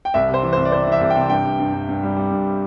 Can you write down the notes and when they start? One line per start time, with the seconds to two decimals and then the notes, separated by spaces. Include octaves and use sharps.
0.05 G5
0.14 C2 E5
0.29 C3
0.34 C5
0.43 E3
0.53 C2 C5
0.65 D5
0.72 C3 C5
0.87 E3 E5
1.01 C2
1.10 G5
1.16 C3
1.30 G2 G5
1.44 G2
1.59 G2
1.74 G2
1.89 G2
2.03 G3
2.17 G3
2.31 G2